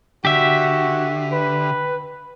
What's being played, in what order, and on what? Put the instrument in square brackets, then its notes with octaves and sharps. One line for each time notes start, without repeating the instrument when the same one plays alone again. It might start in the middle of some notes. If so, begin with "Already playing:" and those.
[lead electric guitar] D3 [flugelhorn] F#4 [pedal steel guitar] G4 E5
[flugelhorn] B4